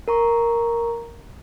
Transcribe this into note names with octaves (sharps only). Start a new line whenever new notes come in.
A#4 A#5 C#6